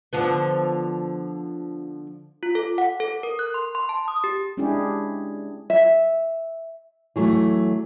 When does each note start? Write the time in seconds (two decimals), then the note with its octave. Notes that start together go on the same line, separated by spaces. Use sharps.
0.13 D3 F3 B3
2.43 F4
2.55 A4
2.78 F#5
3.00 A4
3.23 A#4
3.39 F#6
3.54 C6
3.75 C6
3.89 A5
4.08 D#6
4.24 G4
4.57 G#3 C#4 D4 E4 G4 G#4
5.70 E5
7.16 E3 F#3 A3